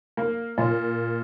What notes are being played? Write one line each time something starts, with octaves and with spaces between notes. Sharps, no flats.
A#3
A#2